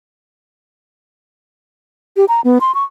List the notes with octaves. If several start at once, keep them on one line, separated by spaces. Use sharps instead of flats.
G4
A#5
B3
C6
C#6